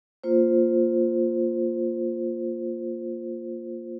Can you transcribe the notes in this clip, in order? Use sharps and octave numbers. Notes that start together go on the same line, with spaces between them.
A#3 F4 C5